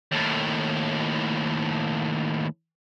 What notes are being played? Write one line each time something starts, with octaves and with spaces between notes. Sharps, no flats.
D#2 A2